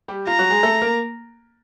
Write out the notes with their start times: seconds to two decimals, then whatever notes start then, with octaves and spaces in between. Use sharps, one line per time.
0.08 G3 G4
0.27 F4 A#5
0.39 F#3 F#4
0.50 G#3 G#4
0.63 A3 A4
0.82 A#3 A#4